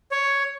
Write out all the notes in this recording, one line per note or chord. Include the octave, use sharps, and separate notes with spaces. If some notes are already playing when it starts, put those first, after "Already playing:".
C#5